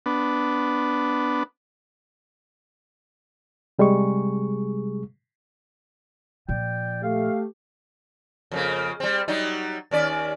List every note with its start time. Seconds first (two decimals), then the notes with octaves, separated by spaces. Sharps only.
0.06 B3 D4
3.79 C3 G3 G#3 G#4 C#6
6.49 A#2 F3 D5 G5
7.03 A3 G4 F5
8.52 F2 C#3 A#3
9.00 G3 C4
9.28 F#3 G3 D#4
9.91 D#2 C#4 D5